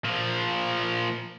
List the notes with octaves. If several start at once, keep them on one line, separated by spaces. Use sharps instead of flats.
A#2 F3